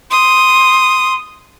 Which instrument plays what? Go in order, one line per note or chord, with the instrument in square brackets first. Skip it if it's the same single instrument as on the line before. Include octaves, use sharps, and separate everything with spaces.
[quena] C6 [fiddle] D#6